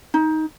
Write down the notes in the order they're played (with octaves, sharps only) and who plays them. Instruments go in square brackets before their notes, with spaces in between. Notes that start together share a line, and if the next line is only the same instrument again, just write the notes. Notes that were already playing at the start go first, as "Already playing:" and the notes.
[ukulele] D#4